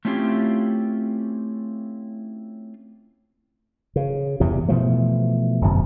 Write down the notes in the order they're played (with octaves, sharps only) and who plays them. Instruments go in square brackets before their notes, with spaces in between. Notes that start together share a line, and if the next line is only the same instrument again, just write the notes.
[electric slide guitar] A3 C4 C#4 E4 F4 G4
[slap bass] C#3
E2 G2 C3
B2 E3 F3 A3
D1 G1 F#2 B2